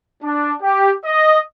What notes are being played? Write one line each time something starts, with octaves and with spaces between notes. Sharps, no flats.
D4
G4
D#5